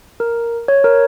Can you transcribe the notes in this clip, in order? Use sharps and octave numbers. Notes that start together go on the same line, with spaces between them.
A#4
C#5
A#4